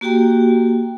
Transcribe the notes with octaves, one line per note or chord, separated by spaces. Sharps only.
A#3 F#4 G4 G5 A#5